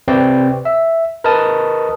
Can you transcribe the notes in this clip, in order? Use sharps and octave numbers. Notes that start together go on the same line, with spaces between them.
C3 C4 B4 D5 G5
E5
A#4 B4 D#5 A5 D#6